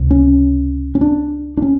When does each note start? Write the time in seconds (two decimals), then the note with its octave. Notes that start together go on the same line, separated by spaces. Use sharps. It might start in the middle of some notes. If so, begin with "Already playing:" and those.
Already playing: C#2 C3
0.11 C#4
0.95 C#4
1.01 D4
1.57 D4
1.62 C#4